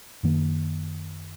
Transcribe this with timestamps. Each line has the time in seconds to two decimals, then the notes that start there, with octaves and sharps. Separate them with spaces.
0.23 F#2 D#3 A#3